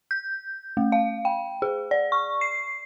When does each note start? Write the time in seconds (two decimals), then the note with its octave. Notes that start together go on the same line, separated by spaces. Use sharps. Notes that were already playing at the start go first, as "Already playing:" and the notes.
0.11 G6
0.77 A3
0.92 F5
1.25 G5
1.62 G#4
1.91 D5
2.12 C#6
2.41 C7